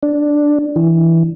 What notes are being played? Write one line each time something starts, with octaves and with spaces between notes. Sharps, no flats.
D4
E3